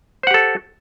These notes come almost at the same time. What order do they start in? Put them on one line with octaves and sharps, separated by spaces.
C5 F#5 G4 A4